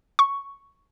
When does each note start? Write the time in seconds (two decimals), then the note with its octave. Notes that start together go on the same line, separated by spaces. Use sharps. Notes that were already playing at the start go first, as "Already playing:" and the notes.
0.19 C#6